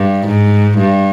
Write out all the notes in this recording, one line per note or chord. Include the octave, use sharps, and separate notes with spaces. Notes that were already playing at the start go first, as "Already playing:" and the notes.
Already playing: G2
G#2
G2